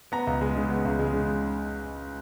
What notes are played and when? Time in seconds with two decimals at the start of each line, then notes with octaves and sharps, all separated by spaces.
0.12 B3 A#5
0.27 C#2
0.41 G#3
0.56 C#3
0.70 B3
0.85 C#2
0.99 G#3
1.13 C#3